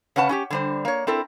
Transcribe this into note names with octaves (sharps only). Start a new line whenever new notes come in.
C#3 C#4 B4 F#5 A5
C#4 F#4 G4
D3 G3 C5
A#3 C#5
C4 E4 A4 A#4